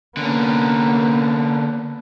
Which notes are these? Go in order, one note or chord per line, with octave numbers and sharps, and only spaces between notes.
D3 A#3 B3 C#4